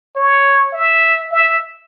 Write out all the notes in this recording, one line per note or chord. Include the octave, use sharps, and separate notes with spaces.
C#5
E5
E5